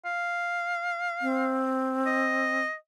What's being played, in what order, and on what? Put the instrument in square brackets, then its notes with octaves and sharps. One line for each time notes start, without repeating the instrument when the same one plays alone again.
[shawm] F5
[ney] C4
[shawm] D#5